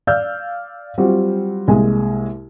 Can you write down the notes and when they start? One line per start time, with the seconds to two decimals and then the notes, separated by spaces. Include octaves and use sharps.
0.07 D5 F5 E6 F6 G6
0.98 F#3 G3 C4 F4 F#4
1.68 C2 G#3 A#3 G#5